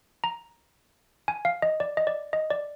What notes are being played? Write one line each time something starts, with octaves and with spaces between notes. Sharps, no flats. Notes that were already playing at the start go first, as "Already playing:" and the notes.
A#5
G#5
F5
D#5
D5
D#5
D5
D#5
D5